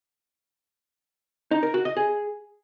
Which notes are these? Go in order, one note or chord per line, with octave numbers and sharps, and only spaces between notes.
D#4
A#4
F#4
D#5
G#4